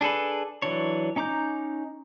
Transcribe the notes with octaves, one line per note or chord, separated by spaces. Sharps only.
D4 G#4 A4 B4
E3 F#3 D4 C#5
C#4 D#4 A#5 D6 G6